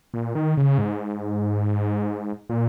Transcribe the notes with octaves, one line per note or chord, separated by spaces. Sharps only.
A#2
D#3
C#3
G#2
A#2